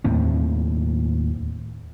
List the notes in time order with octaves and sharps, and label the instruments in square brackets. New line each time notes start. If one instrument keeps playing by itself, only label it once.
[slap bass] D#2 A2 C4